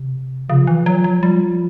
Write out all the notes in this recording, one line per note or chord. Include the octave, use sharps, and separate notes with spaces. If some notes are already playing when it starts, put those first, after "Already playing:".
Already playing: C3
C#3 F3
E3
F#3
F#3
F3 G3